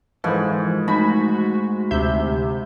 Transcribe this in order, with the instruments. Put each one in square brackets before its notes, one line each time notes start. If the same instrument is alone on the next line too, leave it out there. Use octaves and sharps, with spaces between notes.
[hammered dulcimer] G#2 [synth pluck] E3 F3 [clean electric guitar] A4 A#4 B5
[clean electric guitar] A3 D#4 [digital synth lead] F#4 [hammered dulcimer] B5
[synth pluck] D2 E5 G6 [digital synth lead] C3